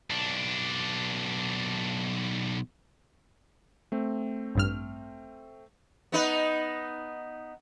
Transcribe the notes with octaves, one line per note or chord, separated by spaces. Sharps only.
B1 D4
A3 C4
A1 G2 F6
B3 D#4 B4